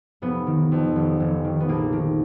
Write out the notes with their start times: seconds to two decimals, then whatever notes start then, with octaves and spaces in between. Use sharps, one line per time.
0.22 F1 B3
0.47 D#3
0.72 F2
0.96 F1
1.20 F1
1.44 D#3
1.60 B3
1.69 A#1 A#3
1.93 D#3